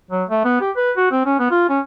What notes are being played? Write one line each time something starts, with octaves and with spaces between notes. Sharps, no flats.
F#3
A3
B3
G4
B4
F#4
C4
C#4
B3
F4
C#4